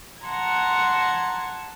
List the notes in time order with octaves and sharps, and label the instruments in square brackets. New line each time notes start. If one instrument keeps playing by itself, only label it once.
[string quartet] F#5 A5 A#5 C6 G#6